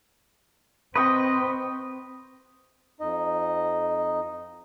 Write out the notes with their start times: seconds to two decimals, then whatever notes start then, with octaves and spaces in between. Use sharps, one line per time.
0.95 C4 B4 D#5 G5 C#6 D#6
3.01 F2 D#4 D#5